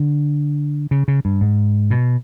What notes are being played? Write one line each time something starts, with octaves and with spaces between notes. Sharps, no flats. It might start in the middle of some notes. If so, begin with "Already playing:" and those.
Already playing: D3
C#3
C#3
G2
G#2
B2